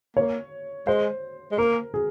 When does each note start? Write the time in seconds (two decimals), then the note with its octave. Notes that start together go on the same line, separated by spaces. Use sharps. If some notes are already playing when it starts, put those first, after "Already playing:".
0.17 A#3 C#5
0.87 G#3 C5
1.51 G#3
1.58 A#3 A#4
1.94 G#4